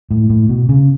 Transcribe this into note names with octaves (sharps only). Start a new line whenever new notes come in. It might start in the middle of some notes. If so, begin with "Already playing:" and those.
A2
A2
B2
C#3